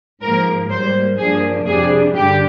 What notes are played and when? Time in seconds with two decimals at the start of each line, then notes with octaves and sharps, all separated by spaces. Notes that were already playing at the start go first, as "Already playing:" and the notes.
0.21 G#2 F3 A#3 A#4
0.70 G#2 G3 A#3 C5
1.18 G2 F3 A#3 D4 G#4
1.66 F2 C3 G3 D4 G#4
2.15 G2 D3 G3 D4 G4